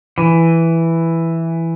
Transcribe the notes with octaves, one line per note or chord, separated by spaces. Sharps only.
E3